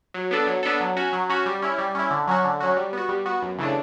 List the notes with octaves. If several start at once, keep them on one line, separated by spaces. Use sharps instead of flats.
F#3
B3 D4 A4
F#3
B3 D4 A4
F#3
C#4 F#4
F#3
C#4 F#4
G3
C#4 E4
G3
C#4 E4
D3
F#3 C#4 F#4
D3
F#3 C#4 F#4
G3
B3 F#4
G3
B3 F#4
F#2
C#3 E3 A3 D4